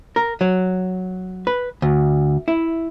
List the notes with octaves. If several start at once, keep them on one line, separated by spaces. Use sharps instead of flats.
A#4
F#3
B4
D2
E4